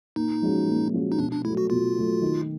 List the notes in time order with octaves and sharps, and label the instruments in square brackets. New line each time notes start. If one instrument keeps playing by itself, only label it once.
[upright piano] A#2 [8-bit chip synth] D#4
[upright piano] F3 G#3 C#4 F#4
A#2
F3 G#3 C#4 F#4
[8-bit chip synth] D#4
[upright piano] B2 [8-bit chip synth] D4
[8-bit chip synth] D4
[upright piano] F#3 A3 [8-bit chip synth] E4
[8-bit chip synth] F#4
[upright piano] B2 [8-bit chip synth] F4
[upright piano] F#3 A3
D#3